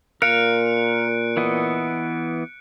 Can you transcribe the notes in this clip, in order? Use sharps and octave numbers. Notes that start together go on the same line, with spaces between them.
A#2 A#4 F5 F#6 C#7 D7
E3 B3 D#5